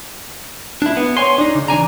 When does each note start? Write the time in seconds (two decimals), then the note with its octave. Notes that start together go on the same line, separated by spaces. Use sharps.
0.82 D4 E4
0.97 B3
1.17 C#5 G#5 C6
1.38 D4 D#4
1.55 C#3
1.68 E3 D4 G#5 A#5